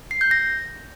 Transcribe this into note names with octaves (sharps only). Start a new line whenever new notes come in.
C7
G6
A#6